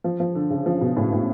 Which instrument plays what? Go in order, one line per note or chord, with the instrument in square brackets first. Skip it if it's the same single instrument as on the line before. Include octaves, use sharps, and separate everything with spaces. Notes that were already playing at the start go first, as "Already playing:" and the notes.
[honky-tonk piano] F3
F3
D3
C#3
F3
B2
A2
A2